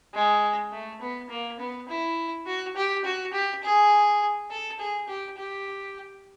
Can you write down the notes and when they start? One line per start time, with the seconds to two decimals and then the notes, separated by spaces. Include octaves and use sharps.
0.14 G#3
0.72 A3
1.01 B3
1.30 A#3
1.59 B3
1.89 E4
2.46 F#4
2.76 G4
3.05 F#4
3.33 G4
3.63 G#4
4.51 A4
4.79 G#4
5.08 G4
5.38 G4